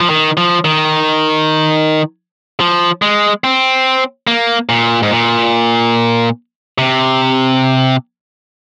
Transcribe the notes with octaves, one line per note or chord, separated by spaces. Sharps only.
F3
D#3
F3
D#3
F3
G#3
C4
A#3
A#2
G#2
A#2
C3